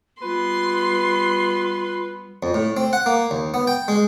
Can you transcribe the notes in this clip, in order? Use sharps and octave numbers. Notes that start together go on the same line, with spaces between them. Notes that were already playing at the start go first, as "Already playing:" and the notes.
G3 B3 F4 B4 C6
F2
A2
C4
F#5
A#3
D#2
B3
G5
G#3